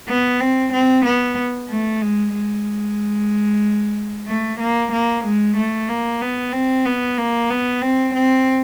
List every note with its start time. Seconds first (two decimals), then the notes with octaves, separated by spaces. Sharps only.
0.08 B3
0.41 C4
0.73 C4
1.05 B3
1.69 A3
2.02 G#3
2.34 G#3
4.27 A3
4.59 A#3
4.92 A#3
5.24 G#3
5.57 A3
5.89 A#3
6.21 B3
6.53 C4
6.86 B3
7.18 A#3
7.50 B3
7.82 C4
8.14 C4